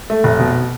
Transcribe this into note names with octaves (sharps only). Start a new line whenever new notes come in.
A3
F1
B2